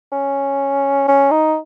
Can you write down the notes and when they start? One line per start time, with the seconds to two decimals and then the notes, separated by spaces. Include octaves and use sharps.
0.12 C#4
1.08 C#4
1.31 D#4